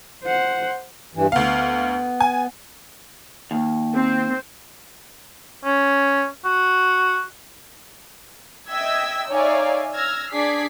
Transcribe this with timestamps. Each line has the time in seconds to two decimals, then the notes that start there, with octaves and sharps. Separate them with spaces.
0.24 C5 F#5
1.15 G2 E3
1.32 D2 B3 F5
2.21 G#5
3.51 D#2
3.92 C4
5.64 C#4
6.45 F#4
8.70 D#5 E5 G5 E6 G#6 B6
9.30 D#4 C#5 D5 E5 F5 G#5
9.93 E6 F6 G#6 A#6
10.32 D4 G#4 D6 G#6 B6 C7